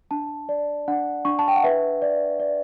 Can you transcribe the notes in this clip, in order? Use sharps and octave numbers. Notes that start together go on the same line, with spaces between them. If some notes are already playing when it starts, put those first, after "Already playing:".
D4 A5
D5
D4 F#5
D4 C#6
A5
G5
F#5
B4 E5
D5
D5